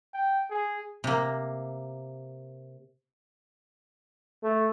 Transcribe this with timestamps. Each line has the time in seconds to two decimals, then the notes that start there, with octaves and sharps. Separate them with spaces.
0.13 G5
0.50 G#4
1.04 C3 A#3
4.43 A3